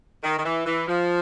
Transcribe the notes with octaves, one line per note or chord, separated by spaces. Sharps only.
D#3
D#3
E3
E3
F3